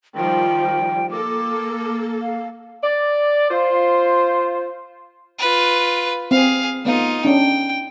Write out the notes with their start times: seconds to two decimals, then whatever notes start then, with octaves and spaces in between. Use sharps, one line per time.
0.15 D#3 F3 G3 G5
1.11 A#3 A4 D6
2.22 F5
2.84 D5
3.50 F4 C5
5.39 F4 B4
6.31 C4 G#4 F5
6.85 A3 B3 D#4 F4 F5
7.25 C#4 D4 G5